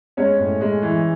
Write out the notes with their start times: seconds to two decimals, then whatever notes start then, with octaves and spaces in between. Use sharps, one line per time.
0.17 G#3 C#4 C#5
0.39 A2
0.61 G#3
0.82 E3